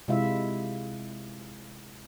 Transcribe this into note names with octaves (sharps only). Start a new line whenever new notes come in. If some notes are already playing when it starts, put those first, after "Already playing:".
C3 G#3 E4 F4 E5